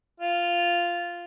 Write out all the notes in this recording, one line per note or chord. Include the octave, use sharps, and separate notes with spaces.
F4